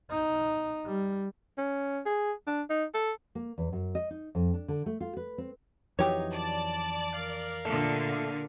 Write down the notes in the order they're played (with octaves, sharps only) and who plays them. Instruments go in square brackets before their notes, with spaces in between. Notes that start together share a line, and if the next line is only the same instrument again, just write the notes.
[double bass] D#4
G3
[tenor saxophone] C#4
G#4
D4
D#4
A4
[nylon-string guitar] A#3
E2
F#2
D#5
D#4
F2
D4
D3
A3
F4
B4
C4
[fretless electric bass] F2 E3 F#3 [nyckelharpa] D#4 [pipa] G4 C#5
[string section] D5 [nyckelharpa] A5
[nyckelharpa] A#4 F5
[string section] A#2 D3 [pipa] A3